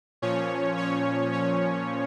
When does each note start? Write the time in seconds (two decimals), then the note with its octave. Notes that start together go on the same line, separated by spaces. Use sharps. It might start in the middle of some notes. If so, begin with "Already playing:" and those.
0.22 A#2 F3 C#4 C#5
0.77 C#4 C#5
1.32 C#4 C#5